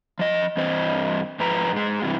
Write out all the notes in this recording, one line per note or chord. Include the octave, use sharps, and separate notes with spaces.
F3 D#5
G2 E3 C4 C5 D#5
G#2 F3 B4 A#5
G#2 G#3
G2 C3 E3